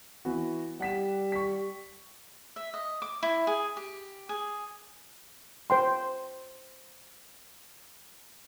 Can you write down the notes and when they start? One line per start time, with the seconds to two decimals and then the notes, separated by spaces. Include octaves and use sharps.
0.25 E3 B3 F#4
0.81 G3 F#5 B6 E7
1.32 C#6 B6
2.56 E5
2.74 D#5
3.02 D6
3.23 E4
3.47 G#4
3.77 G4
4.29 G#4
5.70 C5 G5 C6